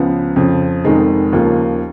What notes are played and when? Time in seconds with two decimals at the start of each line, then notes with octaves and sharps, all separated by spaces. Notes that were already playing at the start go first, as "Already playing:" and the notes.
Already playing: C#2 C#3 F3 B3
0.36 F2 C#3 F3
0.84 F1 F2 D#3 G#3 D#4
1.32 D#2 C#3 F3 A#3 F4